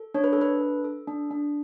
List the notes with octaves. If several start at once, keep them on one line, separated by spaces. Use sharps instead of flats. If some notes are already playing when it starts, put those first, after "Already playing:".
Already playing: A4
D4 C#5
B4
A4
D4 B4
A4
A4
D4
D4